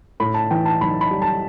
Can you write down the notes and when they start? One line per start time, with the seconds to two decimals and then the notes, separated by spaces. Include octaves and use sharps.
0.20 A2 B5
0.34 A5
0.51 E3 G5
0.66 A5
0.81 B1 B5
1.01 B5
1.11 G3
1.22 A5